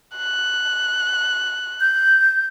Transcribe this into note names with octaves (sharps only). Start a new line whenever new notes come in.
F#6
G6